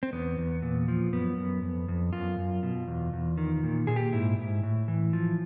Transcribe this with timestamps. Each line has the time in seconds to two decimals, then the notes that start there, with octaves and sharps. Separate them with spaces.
0.03 C4
0.13 E2 B3
0.38 E2
0.62 A#2
0.88 F3
1.13 F#2 B3
1.37 F#2
1.63 F2
1.88 F2
2.13 F#2 F4
2.38 F#2
2.63 B2
2.88 E2
3.13 E2
3.38 D#3
3.63 A#2
3.87 A#2 G#4
3.96 G4
4.12 G#2 E4
4.38 G#2
4.63 A2
4.88 E3
5.13 F3